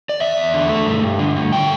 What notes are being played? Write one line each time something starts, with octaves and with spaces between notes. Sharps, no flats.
D5
E2 E5
E2
D3
A3
G2
G2
D3
A3
A3 G5